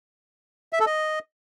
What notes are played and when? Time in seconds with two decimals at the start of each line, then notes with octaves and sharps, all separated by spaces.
0.73 E5
0.80 A4
0.86 D#5